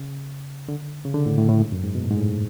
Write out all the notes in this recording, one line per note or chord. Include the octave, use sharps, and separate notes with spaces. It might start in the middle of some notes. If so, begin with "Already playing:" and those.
Already playing: C#3
D3
C#3
D3
A2
A2
A2
G#2
F#2
G#2
B2
A2
G#2
A2